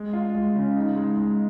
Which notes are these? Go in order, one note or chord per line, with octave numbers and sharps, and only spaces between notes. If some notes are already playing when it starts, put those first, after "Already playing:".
Already playing: G#3
F4
G#3
C#3
D#4
G#3
G#3